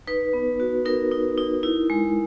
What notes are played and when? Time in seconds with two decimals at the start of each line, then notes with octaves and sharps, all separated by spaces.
0.08 D#4 B4
0.33 B3
0.60 F#4
0.85 D#4 A#4
1.11 D#4
1.38 D#4
1.63 E4
1.90 G#3